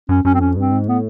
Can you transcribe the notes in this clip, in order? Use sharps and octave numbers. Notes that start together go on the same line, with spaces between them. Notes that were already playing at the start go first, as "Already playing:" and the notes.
F#2 C#4
F#2 C#4
C4
F2 C#4
G2 C4
G#2
A2 B3